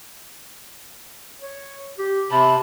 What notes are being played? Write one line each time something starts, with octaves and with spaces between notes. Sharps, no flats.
C#5
G4
C3 A5 B5